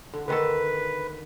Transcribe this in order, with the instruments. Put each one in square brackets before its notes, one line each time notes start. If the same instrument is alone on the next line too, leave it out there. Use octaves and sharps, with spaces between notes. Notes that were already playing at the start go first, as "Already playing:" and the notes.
[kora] D3
[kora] D3 D#3 A4 [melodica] B4